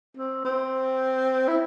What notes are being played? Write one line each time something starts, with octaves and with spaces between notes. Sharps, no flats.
C4
C4
E4